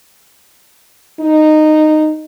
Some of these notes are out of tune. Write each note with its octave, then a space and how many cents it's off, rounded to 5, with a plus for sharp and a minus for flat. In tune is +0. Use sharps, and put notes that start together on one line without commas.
D#4 -15